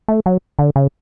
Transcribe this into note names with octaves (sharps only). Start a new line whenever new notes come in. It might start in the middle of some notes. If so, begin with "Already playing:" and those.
A3
F#3
D3
C#3